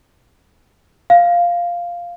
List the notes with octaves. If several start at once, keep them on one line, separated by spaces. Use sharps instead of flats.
F5